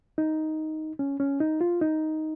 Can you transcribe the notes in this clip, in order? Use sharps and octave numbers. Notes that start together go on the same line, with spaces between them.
D#4
C#4
C#4
D#4
F4
D#4